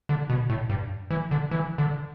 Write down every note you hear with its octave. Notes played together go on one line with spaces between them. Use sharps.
D3
B2
A2
G2
E3
D3
E3
D3